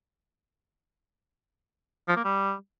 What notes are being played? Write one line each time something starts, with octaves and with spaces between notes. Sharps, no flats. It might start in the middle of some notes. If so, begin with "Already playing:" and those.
F3
A#3
G3